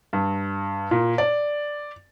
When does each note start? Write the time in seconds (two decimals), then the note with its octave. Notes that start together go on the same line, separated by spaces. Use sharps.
0.13 G2
0.91 A#2
1.18 D5